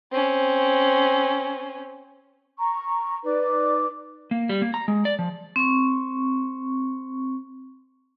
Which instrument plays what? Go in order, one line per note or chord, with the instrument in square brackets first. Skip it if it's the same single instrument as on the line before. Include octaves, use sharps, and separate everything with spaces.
[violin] C4 C#4
[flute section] A#5 C#6
D#4 B4 D5 D6
[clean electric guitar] A#3
G3
A#3
A#5
G#3
D5
F3
[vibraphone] C4 C#6